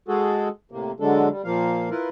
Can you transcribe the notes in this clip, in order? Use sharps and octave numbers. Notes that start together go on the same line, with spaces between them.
G#3 F#4 G#4 A4
A2 C3 A#3
D3 F#3 G#3 D4 A4
G3
A#2 F3 A#3 F5
E4 F4 A#4 B4